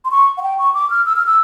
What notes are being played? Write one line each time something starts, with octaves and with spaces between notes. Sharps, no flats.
C6
C#6
F#5
G5
C#6
D6
F6
E6
F6
E6